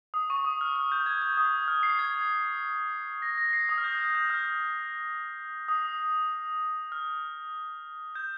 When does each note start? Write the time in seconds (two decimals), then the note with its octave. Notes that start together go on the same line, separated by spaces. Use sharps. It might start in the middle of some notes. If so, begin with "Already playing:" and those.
0.14 D#6
0.30 C#6
0.45 D#6
0.61 F6
0.76 F6
0.92 G6
1.06 G#6
1.22 G6
1.37 D#6
1.68 F6
1.83 C7
1.99 G#6
3.22 A#6
3.38 A#6
3.53 C7
3.69 D#6
3.78 F6
3.84 G6
3.99 F6
4.15 G6
4.30 F6
5.68 D#6
6.92 F6
8.15 G6